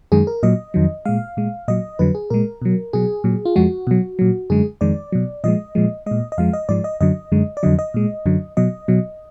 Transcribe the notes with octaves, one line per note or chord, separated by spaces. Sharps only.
F#2 D#3 G#3 G#4
A#4
A#2 F#3 D#5
F2 D#3 F#3
A#2 G#3 F5
A#2 G#3
A#2 F#3 D#5
F2 D3 F#3 B4
G#4
A#2 G#3 A#4
B2 F#3
B2 F#3 G#4
A#2 F#3
F4
F2 F3 G#3 F#4
B2 F#3
A#2 F#3
F#2 D3 G#3 G#4
F2 D#3 G#3 D5
B2 F#3
A#2 F3 G#3 D#5
A#2 F3 G#3
A#2 G#3 D#5
D#5
F2 F3 G#3 F5
D#5
G#2 F3 G#3 D5
D#5
F#2 D3 F#3 D#5
F#2 D3 G#3
D5
F2 D3 F#3 D#5
D#5
A#2 G#3
F#2 D3 F#3
B2 F#3 D#5
B2 F#3